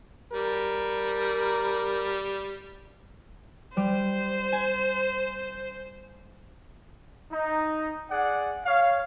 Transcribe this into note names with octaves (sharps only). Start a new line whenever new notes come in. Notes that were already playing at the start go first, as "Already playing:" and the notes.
G3 A#4
G3 C5
G#5
D#4
G#4 D5 F#5
C#5 F5